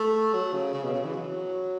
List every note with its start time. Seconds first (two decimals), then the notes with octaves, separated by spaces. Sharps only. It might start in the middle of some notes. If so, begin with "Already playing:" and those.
Already playing: A3
0.34 F#3
0.53 C#3
0.73 C#3
0.84 B2
0.94 C#3
1.04 E3
1.15 F#3